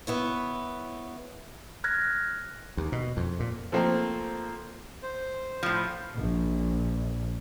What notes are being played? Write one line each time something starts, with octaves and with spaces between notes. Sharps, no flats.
B3 E4 C#5
F6 F#6 G#6 A#6
D#2
B2
F2
A#2
F3 A3 A#3 C4
C5
A2 F3
A#1